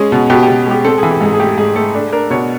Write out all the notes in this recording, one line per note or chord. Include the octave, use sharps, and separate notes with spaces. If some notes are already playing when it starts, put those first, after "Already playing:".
Already playing: G#3 C#4 G#4
B2
B2 G4
G4
B2
G#3 G4
C4 A4
G#4
E3
G4
G#2 G#4
G#4
A3 G4
G#2 G#4
A3 A4
D4 A4
D4 A#4
B2 C#5